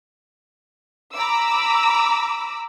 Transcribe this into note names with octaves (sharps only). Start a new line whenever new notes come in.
A#5 B5 D6 E6